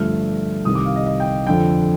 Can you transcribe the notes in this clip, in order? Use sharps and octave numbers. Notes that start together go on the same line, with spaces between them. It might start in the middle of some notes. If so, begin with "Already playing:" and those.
Already playing: G2 D3 F3 A3 F6
C2 C3 D#3 D#6
D6
F5
D#5
D#5
G5
F2 D3 F3 G5